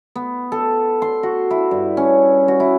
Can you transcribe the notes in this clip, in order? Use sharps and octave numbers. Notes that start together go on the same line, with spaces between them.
B3
A4
C6
F#4
E4
G2
C#4
F#4
E4